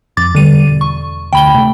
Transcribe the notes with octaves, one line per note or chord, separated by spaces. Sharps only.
F2 D6 A6
E2 D3 G3 D#7
E1
C#6
D2 G5 B5 G7
C3 A3